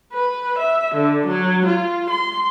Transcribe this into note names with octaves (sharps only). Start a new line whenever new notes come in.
B4
E5
D3
F#3
F4
C6